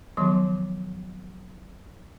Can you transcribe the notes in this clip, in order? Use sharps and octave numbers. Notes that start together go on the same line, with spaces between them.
D#3 F3 F#3 B3 C6 D6